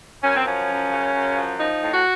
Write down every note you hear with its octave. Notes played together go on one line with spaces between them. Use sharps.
F#2 C#4
C4
F3 C#4
F#2
C#3
F#2
F3
F3 D#4
A2
F#4